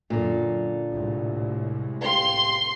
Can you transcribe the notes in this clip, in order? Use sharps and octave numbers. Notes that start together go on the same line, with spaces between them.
F#2 A#2 D3
C2 A2 G#3
G4 F5 C6